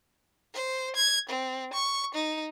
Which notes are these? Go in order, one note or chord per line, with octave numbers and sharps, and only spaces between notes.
C5
G#6
C4
C#6
D#4